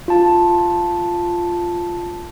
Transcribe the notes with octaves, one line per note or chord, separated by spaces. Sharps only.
F4 A5